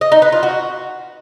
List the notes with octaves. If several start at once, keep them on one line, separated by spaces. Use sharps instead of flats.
D#5
D#4
B4
F4
F#4